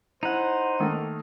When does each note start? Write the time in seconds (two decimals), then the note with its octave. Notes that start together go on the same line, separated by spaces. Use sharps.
0.23 D#4 E4 C5 F#5
0.80 D#3 A3 A#3